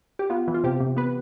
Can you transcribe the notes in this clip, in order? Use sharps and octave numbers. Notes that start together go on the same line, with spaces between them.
G4
B3 F4
E3
F4
C3 G4
C3
B3 B4